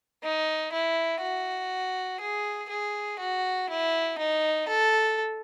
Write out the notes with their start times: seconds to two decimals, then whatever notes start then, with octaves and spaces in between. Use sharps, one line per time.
0.23 D#4
0.72 E4
1.21 F#4
2.21 G#4
2.70 G#4
3.19 F#4
3.70 E4
4.18 D#4
4.68 A4